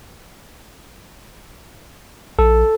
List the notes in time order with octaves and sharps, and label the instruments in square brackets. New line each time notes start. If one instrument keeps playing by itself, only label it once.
[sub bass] A#1 [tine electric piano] A4